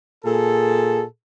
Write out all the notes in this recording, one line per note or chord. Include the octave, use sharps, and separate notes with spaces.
A#2 G#4 A4